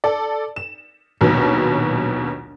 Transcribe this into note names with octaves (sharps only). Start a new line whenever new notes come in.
A4 D5
E7
A#1 D#2 B2 F#3